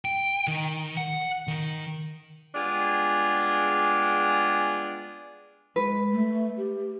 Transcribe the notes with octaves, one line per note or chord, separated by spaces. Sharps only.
G5
D#3
F#5
D#3
G3 G#3 B3 D4 F4 G#4
G#3 B4
A3
G4